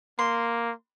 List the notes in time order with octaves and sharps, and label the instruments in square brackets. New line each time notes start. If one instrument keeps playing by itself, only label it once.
[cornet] A#3 [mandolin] C6